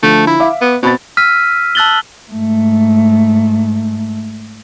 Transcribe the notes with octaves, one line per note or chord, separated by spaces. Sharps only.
D3 F3 A3
E4
E5 F5 D6
B3
B2 C4 B5 A6
E6 F6 B6 D#7
A5 E6 F#6 A6 F#7 G7
G#2 A3